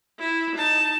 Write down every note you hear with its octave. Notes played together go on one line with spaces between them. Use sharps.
E4
D#4 A5